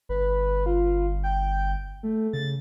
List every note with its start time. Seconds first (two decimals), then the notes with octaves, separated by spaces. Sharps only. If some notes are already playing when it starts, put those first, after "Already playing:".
0.09 G1 B4
0.66 F4
1.23 G5
2.03 A3
2.33 C#3 A6